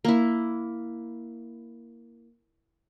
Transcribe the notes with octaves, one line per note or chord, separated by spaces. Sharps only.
A#3 E4